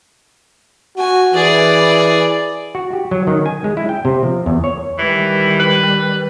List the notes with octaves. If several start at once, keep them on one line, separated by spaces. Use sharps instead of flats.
F#4 G#5
E3 G#4 D5
F#4
G4
F#3
D#3
G#5
G#3
E4
G5
C3
F3
E2
C#5
D#3 E3 G3
B4